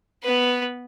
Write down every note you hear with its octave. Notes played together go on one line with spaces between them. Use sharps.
B3 B4